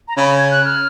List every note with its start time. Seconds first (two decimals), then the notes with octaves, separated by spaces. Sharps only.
0.08 A#5
0.17 C#3 B5
0.38 G#6
0.51 F#6
0.65 F6